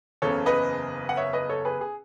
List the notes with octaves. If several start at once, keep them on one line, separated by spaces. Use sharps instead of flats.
F#1 E2 C#3 A4 C#5
B4 D#5
F#5
C#5 E5
B4 D#5
A4 C#5
G#4 B4
G#4